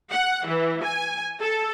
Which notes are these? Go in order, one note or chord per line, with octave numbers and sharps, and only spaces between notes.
F#5
E3
G#5
A4